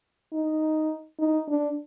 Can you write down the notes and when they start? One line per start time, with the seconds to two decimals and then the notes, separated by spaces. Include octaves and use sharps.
0.33 D#4
1.19 D#4
1.48 D4